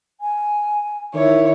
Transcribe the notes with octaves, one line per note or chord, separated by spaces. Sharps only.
G#5
D#3 E4 C#5